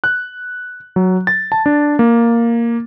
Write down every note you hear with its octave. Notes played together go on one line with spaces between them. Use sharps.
F#6
F#3
A6
A5
D4
A#3